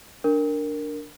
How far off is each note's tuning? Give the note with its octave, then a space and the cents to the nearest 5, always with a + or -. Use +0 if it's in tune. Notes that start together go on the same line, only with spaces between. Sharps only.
D4 +0 A#4 -5